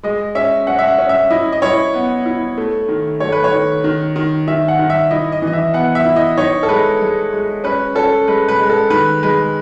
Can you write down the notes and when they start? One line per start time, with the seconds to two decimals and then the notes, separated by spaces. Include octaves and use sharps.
0.03 G#3 D#5
0.35 C#4 E5
0.67 C#4 F#5
0.79 E5
0.88 F#5
0.98 C#4
1.09 E5
1.31 E4 D#5
1.53 D#5
1.62 E4 C#5
1.94 B3
2.26 E4
2.58 A3
2.89 D#3
3.20 A3 C#5
3.32 B4
3.44 C#5
3.53 D#3
3.84 D#3
4.16 D#3
4.48 D#3 E5
4.68 F#5
4.79 D#3
4.90 E5
5.11 E4 D#5
5.32 D#5
5.42 E3
5.47 D#5
5.53 E5
5.74 B3 F#5
5.95 E5
6.05 E4
6.16 D#5
6.37 D#4 C#5
6.63 A4
6.69 G#3 B4
7.01 G#3
7.32 G#3
7.64 C#4 B4
7.95 C#4 A4
8.27 G#3 B4
8.49 B4
8.59 G#3
8.69 A4
8.90 D#3 B4
9.23 G#3 B4